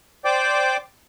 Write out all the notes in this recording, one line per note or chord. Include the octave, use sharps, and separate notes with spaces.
C5 D5 G5 D6